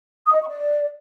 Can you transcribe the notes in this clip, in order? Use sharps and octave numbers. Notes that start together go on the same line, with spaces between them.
D#6
D#5
C#6
D5